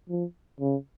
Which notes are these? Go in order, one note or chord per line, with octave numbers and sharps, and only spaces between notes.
F3
C#3